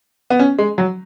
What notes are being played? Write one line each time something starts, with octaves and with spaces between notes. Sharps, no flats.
B3
C#4
G#3
F#3